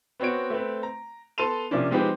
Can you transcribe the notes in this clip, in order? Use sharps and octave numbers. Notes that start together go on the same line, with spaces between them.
B3 C4 F#4 C#5 D7
A3 C4 B4
A#5
B3 A4 A5 C6 D#7 F7
C3 F3 A#3 C#4 D4
F3 G#3 C4 D#4 G4 B4